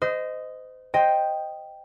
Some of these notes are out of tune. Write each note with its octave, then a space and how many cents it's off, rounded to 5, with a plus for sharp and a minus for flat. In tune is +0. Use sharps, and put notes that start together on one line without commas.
C5 -30 D#5 +0 D#6 +0
C5 +5 D#5 +0 G5 +0